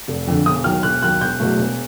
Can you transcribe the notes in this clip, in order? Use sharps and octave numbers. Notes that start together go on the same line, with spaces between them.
F1
F2 D3
E1 D#6
D#2 D#3 F#3 F6
E1 F#6
D#2 D#3 F#3 F#6
E1 G6
E2 B2 F#3 A3
E1